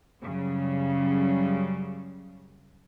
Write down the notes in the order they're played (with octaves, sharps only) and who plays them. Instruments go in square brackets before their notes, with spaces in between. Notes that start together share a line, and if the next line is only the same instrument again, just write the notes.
[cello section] F#2 C#3 G3